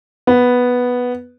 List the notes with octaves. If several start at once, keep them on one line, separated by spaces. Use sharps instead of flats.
B3